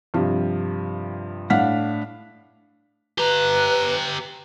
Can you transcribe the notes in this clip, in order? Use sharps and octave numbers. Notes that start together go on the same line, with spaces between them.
G2 C3 F3
A2 D4 F5 F#5 F6 B6
G4 B4 A#5